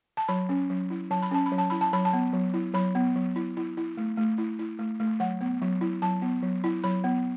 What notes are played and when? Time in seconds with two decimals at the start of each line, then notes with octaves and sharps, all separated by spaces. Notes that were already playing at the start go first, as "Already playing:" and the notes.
0.17 A5
0.28 F#3 B5
0.49 C#4
0.70 F#3
0.90 E4
1.11 F#3 A5
1.23 B5
1.31 C#4 A5
1.46 B5
1.52 F#3
1.58 A5
1.70 E4 B5
1.81 A5
1.93 F#3 B5
2.05 A5
2.13 B3
2.33 F#3
2.54 E4
2.74 F#3 B5
2.95 B3
3.16 F#3
3.36 E4
3.57 E4
3.77 E4
3.97 A3
4.17 A3
4.38 E4
4.59 E4
4.79 A3
5.00 A3
5.20 F#3 F#5
5.41 B3
5.62 F#3
5.81 E4
6.02 F#3 A5
6.22 B3
6.43 F#3
6.64 E4
6.84 F#3 B5
7.04 B3